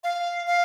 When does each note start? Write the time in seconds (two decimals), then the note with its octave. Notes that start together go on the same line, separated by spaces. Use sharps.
0.04 F5
0.47 F5